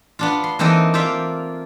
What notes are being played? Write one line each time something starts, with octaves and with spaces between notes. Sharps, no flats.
B3 D4 F4
C6
E3 A#3 C4 D#4 A4 D#5
F4 C5 D5 E5 F5